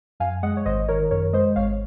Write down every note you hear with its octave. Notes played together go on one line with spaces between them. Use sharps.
F#2 F5 G#5
G#3 D#5 F#5
C#5
G#1 C5 D#5
D#3 A#4 C#5
F#2 A#4 C#5
G#3 C5 D#5
G#1 C#5 F5